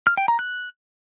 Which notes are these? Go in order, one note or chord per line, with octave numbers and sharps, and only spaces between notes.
F6
G5
A#5
F#6